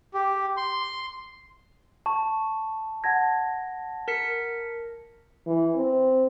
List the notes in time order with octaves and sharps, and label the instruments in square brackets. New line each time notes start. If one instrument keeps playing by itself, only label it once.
[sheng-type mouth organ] G4
C6
[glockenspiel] A5 [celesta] C#6
[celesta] F#5 A5 G#6 [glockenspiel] A#6
[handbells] A#4 B6 C#7
[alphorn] E3
C4